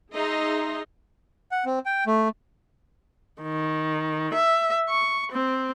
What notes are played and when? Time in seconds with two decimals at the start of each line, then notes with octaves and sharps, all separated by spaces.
0.13 D#4 G#4 D#5 E5 A#5 C6
1.52 F#5
1.65 C4
1.86 G5
2.07 A3
3.43 D#3
4.34 E5
4.89 C#6
5.32 C4